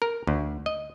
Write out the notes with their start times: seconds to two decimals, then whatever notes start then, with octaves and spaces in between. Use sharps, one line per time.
0.02 A#4
0.27 D2
0.66 D#5